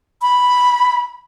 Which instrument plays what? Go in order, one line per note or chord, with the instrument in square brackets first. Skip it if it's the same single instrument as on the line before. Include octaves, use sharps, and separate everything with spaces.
[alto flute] B5